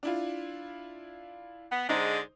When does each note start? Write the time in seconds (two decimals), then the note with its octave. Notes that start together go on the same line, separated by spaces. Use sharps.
0.03 D4 E4 F4
1.72 B3
1.89 D3 G#3 D#4 C5